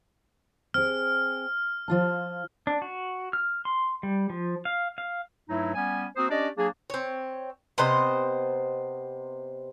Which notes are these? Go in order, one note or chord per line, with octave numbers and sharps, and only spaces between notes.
C4 G#4 F6
F3 F4 A5
D4
F#4
F6
C6
G3
F3
F5
F5
G2 F#3 A3 D#4 E4
G3 B3 C#4 G#5
A#3 C4 F#4 C5 D#6
C#4 D4 G4 D5 D#5
F#3 A#3 D4 G#4
C4 C#5
C3 B3 C5 D#5